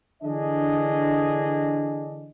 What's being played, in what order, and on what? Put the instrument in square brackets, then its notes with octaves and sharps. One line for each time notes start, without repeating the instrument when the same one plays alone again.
[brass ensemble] D3 E3 D4 G#4 D#5